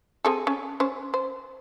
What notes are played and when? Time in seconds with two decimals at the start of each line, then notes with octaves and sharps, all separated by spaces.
0.25 C4 G#4 A4
0.47 C#4
0.80 C#4 C5
1.14 C5